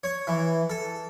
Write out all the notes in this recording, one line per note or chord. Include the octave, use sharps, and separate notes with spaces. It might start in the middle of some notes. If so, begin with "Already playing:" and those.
C#5
E3
A4